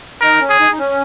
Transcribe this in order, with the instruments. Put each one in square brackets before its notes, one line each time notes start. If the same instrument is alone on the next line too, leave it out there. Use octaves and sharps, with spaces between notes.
[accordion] D#4 [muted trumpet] A#4
[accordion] C#4
[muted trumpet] G#4
[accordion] D#4
D#4
C#4